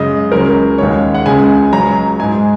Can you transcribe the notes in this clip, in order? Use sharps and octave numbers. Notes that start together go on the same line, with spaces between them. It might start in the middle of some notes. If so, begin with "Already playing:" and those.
Already playing: F#2 C#3 G#3 D#5
C#2 C#3 F#3 A#4
D#2 C#3 G#3 C#5
F#5
C#2 C#3 G#3 G#5
C#2 C#3 F#3 A#5
G#2 G#3 G#5